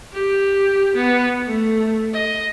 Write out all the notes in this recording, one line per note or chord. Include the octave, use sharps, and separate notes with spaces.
G4
B3
A3
D#5